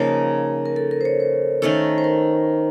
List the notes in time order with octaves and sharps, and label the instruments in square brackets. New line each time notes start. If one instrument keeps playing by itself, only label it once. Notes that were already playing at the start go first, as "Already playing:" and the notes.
Already playing: [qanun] C#3 F3 A#3 D#4 [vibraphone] A#4
[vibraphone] A#4
A4
A#4
C5
C#5
C5
[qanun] D#3 A3 C#4 A4
[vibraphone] C5
A#4